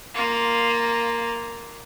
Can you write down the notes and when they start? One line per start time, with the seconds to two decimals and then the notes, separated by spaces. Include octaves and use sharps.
0.14 A#3 F4